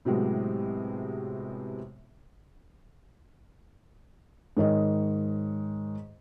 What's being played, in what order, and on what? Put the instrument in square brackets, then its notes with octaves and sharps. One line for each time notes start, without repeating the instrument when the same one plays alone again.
[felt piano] A2 C3 F#3 G#3 B3
G#2 D#3 C#5 D#5